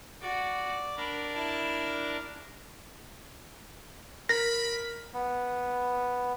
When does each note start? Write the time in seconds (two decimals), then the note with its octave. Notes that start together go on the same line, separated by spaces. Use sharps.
0.22 F#4 D5
0.97 D4 A#4 B5
1.35 E4 A5
4.29 A#4 B5 A#6
5.14 B3